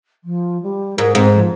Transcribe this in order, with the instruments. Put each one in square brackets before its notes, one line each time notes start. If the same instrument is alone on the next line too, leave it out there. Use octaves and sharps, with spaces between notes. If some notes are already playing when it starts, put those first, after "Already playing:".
[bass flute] F3
G3
[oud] G#2 [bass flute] A#4
[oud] G#2 [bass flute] C4
[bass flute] F3